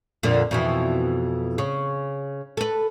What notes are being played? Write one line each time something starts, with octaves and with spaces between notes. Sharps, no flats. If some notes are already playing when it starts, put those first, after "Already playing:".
F2 A#2 D3
F2 B2 E3
C#3
A4 B4